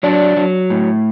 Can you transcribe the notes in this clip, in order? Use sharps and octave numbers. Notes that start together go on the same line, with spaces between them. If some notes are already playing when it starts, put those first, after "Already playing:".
F#3 D4 D5
F#3
A2